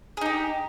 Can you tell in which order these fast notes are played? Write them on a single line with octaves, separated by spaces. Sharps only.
G#4 D#4 G4